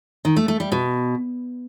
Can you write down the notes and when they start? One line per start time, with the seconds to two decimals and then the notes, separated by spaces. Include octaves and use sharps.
0.25 D#3
0.36 A3
0.48 A3
0.60 G3
0.72 B2